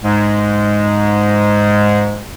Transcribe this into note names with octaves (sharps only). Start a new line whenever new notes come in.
G#2 G#3